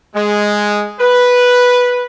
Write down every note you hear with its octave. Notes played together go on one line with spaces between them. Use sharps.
G#3
B4